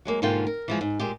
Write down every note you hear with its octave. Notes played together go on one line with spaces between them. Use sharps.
F#3 G#3 A#3
G#2 B2 D3 A#3 F4 G5
A#4
E3 F3 G#3
G#2
A#2 G#3 G4